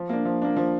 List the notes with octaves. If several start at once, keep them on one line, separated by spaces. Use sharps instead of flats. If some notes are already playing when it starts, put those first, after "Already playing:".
Already playing: F3
A#3 D4
F3
A#3 D4
F3